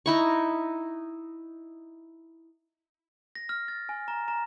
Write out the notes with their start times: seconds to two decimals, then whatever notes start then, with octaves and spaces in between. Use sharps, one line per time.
0.06 D#4 E4 C#6
3.35 A#6
3.49 F6
3.68 A6
3.89 G#5
4.08 A#5
4.28 A#5